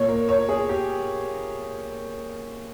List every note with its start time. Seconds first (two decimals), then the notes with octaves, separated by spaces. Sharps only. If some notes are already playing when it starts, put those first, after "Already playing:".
Already playing: A#2 C#5
0.09 A#4
0.29 C#5
0.49 G#4
0.69 G4